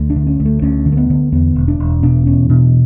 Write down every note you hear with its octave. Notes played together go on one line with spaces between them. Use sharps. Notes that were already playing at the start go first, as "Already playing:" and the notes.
Already playing: D2
D4
D3
C#4
D2
A3
D2 C#4
D3
A3
B3
D3
E2 B3
E1
D4
E1
B2 D4
E2 C#4
B2 D4